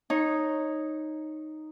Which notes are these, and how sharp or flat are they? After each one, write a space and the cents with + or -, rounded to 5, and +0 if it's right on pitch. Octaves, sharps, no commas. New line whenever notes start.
D#4 -5 C#5 -15